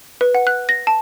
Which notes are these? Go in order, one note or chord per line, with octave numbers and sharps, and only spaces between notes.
B4
F#5
F#6
A#6
A5